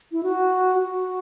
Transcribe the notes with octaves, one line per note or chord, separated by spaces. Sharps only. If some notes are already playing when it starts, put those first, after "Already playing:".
E4
F#4
F#4